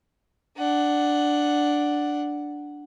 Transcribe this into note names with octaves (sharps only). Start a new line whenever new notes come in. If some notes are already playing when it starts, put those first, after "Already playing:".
D4 F#5